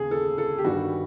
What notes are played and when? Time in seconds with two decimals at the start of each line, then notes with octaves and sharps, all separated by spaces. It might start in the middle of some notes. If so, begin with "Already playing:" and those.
Already playing: D#2 C#3 G#4
0.11 A4
0.38 A4
0.58 G4
0.64 G2 D#3 G3 F#4